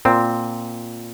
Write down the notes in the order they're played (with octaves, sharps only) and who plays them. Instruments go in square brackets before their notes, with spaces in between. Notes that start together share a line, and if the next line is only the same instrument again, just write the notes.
[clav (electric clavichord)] A#2 C4